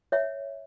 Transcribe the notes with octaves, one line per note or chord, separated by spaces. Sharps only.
C#5 E5